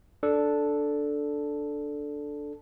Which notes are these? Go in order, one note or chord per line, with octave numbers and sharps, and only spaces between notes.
D4 A4